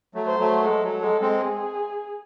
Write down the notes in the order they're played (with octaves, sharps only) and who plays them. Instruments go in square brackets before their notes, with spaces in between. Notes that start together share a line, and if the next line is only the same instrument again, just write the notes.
[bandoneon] F#3 A3
[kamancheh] C5
[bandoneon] F#3 A3
[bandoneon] G#3 [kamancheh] A4
[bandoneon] F#3
[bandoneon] G#3 [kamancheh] A4
[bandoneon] G#3 C4
[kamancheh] G#4